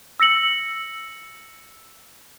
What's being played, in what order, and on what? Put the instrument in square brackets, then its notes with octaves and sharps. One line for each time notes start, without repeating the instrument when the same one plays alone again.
[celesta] E6 A#6 C#7 F#7